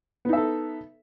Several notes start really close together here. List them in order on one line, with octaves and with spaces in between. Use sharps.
B3 D#4 E5 A4